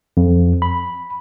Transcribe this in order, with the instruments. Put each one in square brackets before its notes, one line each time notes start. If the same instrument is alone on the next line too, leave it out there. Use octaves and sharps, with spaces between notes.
[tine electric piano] F2
B5